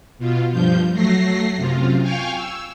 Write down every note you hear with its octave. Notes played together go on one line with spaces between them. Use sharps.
B2 F4
G2 F3 G6
F#3 A3 A#6 C7
F#2 C3 F4
F5 G5 G#5 C#6 F6
E6